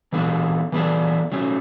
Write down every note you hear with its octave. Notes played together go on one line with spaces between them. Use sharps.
E3 B3 D4 A4
E3 B3 D4 A4
F#3 A3 C#4